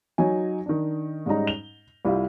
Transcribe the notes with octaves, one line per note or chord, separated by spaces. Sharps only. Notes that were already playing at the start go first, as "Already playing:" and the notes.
F#3 D#4 G#5
D#3 D4
G#2 G3 C#4 D#4 A#5
F7 G7
C2 E4 F4 G4